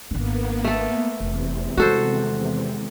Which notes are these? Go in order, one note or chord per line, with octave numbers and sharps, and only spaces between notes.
G#1 A#3 B3 D4
A3 A4
F1 E2 C3
D#3 G#3 F#4 A4 C5